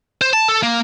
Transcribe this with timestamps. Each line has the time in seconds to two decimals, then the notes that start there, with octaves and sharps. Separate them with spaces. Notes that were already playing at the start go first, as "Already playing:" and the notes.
0.21 C5
0.33 A5
0.49 A4
0.63 A#3